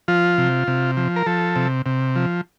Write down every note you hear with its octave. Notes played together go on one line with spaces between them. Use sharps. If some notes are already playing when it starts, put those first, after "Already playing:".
F3 F4
C3
C3
F3
A#4
F3 A4
C3
C3
F3